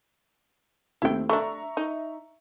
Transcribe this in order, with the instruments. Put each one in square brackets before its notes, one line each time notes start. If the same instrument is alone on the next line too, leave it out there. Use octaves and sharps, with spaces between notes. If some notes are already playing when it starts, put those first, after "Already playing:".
[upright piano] D#2 A3 C4 [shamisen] E4 G5
[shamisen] A3 D4 [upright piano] E5 A#5 C#6
[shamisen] D#4